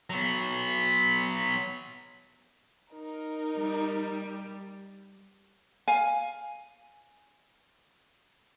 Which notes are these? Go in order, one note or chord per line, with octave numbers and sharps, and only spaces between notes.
F#3 B3
D#4 A#4
G3
F5 G#5